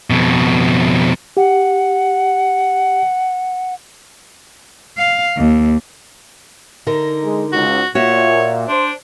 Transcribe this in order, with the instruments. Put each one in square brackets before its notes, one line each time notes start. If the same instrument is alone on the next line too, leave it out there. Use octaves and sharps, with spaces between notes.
[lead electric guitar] F2 B2
[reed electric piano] G4 [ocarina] F#5
[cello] F5
D#2
[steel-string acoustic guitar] D3 D#4 A#4
[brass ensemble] G#3
[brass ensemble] C#2 G#2 [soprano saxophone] F#4
[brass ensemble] A#2 [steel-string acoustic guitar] F#4 E5 [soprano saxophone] C#5
[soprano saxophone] D4 [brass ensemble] C5